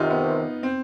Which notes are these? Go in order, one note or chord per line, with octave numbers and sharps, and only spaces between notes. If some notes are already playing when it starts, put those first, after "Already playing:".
Already playing: E2 C3 D#3 D#4 F4
B3
C4